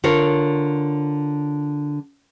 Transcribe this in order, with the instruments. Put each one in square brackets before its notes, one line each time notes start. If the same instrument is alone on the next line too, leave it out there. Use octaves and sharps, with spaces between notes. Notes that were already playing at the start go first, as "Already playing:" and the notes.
[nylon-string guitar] D3 F4 A#4 C#5